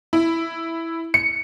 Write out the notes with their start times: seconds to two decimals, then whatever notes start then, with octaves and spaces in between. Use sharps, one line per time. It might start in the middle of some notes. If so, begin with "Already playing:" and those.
0.13 E4
1.14 C#7